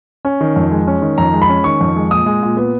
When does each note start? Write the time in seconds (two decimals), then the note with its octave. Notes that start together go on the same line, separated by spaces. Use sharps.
0.25 C#4
0.41 D#3
0.56 F2
0.71 G#3
0.87 C#4
1.02 D#3
1.18 F2 A#5
1.34 G#3
1.42 B5
1.49 C#4
1.64 D#3 C#6
1.81 F2
1.96 G#3
2.11 A#2 D#6
2.26 G#3
2.43 A#2
2.57 B3